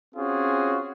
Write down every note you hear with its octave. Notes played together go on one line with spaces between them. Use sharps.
C4 C#4 F4 F#4 G#4